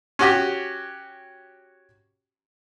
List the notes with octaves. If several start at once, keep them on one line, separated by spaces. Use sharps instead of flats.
C#4 F#4 G4